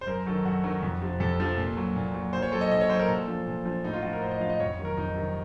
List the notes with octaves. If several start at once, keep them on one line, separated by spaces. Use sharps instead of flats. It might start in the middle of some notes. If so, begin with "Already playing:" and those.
C5
F#2 A#4
D#3 F#3 A4
F#2 F#4
D#3 F#3
F2
C3 F3
F2 A4
C3 F3
A#2
F#3
A#2
F#3
A#2 C5
C#5
F#3 A4
D#5
A#2 D#5
C#5
F#3 C5
A#4
A#2 A4
F3
A#2
F3
A2 D#4
F4
F3 F#4
A#4
A2 C5
D#5
F3 F5
D#5
F2 C#5
C3 D#3 F#3
A#4
F2 D#4
C3 D#3 F#3